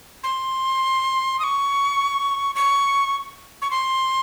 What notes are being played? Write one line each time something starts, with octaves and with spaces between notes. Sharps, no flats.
C6
D#6
C#6
C#6
C#6
C6